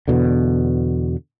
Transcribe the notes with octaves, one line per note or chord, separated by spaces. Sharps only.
E2 B2 D3